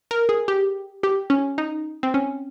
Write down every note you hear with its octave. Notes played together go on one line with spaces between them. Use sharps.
A#4
G#4
G4
G4
C#4
D#4
C4
C#4